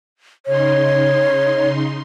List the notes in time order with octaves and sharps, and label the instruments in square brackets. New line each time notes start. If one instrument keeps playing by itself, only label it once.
[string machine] C#3 D#4 C6 [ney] C#5